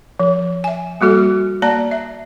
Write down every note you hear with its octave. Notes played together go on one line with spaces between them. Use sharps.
F3
E5 G#5
G3 A#3 F#4 A4
A#3 D5 A5 A#5
E5